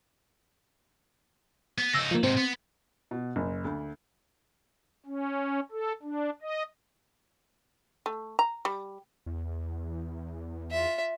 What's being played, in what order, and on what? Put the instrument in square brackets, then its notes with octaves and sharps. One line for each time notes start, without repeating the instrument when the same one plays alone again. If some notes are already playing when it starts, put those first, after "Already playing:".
[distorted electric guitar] B3
[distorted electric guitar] C#3 D#4 [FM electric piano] E6 A#6
[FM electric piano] F3 A#3
[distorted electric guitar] G#2 C3 [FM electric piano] C4
[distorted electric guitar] B3
[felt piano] B2
F#1
D2
[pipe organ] C#4
A4
D4
D#5
[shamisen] A3
A#5
G3
[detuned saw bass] E2
[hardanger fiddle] F4 E5